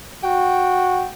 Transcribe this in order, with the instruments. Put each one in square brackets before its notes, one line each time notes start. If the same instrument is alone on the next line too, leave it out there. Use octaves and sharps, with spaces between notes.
[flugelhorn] F#4 [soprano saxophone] G5